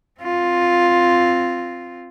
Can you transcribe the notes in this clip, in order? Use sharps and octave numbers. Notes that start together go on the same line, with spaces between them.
C4 F4